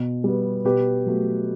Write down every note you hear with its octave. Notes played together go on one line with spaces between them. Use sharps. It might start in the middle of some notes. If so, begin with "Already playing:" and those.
Already playing: B2
G3 B3
B2 G4 B4
F#3 A3